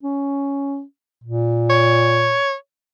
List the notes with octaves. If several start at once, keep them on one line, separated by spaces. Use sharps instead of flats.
C#4
A#2
C#5